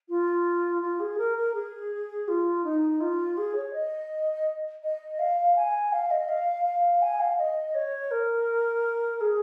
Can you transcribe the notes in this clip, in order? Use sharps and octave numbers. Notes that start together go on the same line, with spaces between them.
F4
F4
G#4
A#4
A#4
G#4
F4
D#4
F4
G#4
C#5
D#5
D#5
F5
G#5
F5
D#5
F5
F5
G#5
F5
D#5
C#5
A#4
G#4